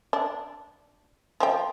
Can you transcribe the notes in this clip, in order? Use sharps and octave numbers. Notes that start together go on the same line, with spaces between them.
D4
F3 G5